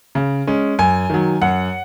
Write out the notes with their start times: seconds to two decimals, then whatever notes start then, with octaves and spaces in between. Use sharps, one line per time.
0.15 C#3
0.47 G#3 C#4
0.79 F#2 G#5
1.10 D#3 F#3
1.42 F#2 F#5